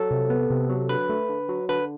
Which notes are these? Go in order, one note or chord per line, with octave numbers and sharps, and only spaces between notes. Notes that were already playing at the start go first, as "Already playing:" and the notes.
Already playing: F#3 A4
C3
B3
C3
F#3
D3 B4
A3
D3
F#3
D3 B4